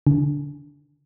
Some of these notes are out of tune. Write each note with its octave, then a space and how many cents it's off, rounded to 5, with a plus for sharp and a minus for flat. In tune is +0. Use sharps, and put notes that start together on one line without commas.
D3 -20